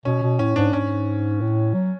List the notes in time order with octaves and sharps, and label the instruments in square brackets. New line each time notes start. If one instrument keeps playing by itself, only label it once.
[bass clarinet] B2 [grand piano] C#4
[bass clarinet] B2
[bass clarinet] A2 [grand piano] C#4
[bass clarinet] G#2 [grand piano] D4
[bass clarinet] G#2 [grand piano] C#4
[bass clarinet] A2
F#3